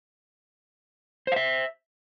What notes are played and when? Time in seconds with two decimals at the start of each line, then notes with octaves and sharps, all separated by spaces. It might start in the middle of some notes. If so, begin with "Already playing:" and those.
1.27 C5
1.32 F5
1.36 E5